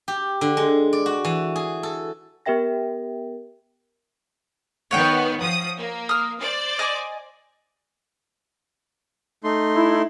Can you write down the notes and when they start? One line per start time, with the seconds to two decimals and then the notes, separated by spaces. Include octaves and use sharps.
0.08 G4
0.41 D3
0.57 G#3
0.93 D5
1.06 F#4
1.25 E3
1.56 G#4
1.83 A4
2.46 B3 G4 A#4 E5 G5 A#6
4.91 D#3 B3 C#5 F#5 G5
5.38 F3 D#6
5.78 A#3
6.09 D#6 F6
6.42 C5 D5
6.79 D#5 G#5 D6
9.44 A3 D#4 C6
9.75 E4